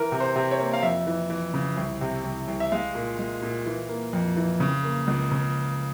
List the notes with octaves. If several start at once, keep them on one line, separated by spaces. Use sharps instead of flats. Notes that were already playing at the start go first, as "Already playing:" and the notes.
Already playing: E3 A#4
C3
C5
C3
C#5
A#3
F5
F2 E5
E3
E3
C#3
C2
C3
C2
C2
E5
G#3 F5
A#2
G#3
A#2
E3
A#3
F2
E3
C#3
A#3
C#2
C#3